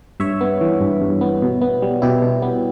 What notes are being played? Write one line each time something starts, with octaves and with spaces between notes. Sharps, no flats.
G2 C#5 E5
B3
E3
G2
G2
B3
B2
B3
G3
B2 E4 G4
B2
B3